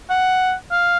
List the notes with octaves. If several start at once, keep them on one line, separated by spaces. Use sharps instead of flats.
F#5
F5